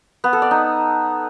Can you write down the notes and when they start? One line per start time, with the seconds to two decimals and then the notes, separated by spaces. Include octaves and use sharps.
0.24 B3
0.33 A4
0.42 D5
0.51 D#4